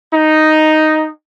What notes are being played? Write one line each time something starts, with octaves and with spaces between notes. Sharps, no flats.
D#4